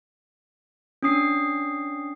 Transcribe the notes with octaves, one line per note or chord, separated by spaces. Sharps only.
C#4 D4 D#6 C7